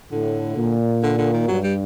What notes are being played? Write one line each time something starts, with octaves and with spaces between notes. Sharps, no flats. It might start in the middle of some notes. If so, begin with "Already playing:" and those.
A2 D3
A#2
D3
D3
D#3
G2 F#3
G3